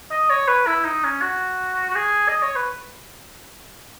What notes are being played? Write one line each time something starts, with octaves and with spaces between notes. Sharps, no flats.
D#5
C#5
B4
E4
D#4
C#4
F#4
F#4
G#4
D#5
C#5
B4